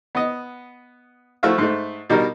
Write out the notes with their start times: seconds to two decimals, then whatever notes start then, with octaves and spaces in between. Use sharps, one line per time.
0.15 B3 D#5
1.43 F3 A3 E4 F#4 E5 F5
1.58 G#2 A3
2.10 B2 G3 D#4 A#4